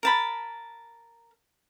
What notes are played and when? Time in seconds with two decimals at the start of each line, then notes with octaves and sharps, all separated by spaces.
0.03 A#4 A5 B5